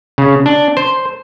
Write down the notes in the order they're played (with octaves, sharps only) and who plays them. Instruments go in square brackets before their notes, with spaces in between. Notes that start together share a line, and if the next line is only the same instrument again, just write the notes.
[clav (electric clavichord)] C#3
D4
C5